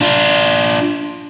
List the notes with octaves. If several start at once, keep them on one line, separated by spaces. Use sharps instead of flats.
D4 F4